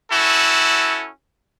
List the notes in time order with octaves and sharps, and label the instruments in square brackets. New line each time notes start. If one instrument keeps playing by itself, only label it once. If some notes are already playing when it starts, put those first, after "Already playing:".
[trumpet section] C#4 E4 F#4 A4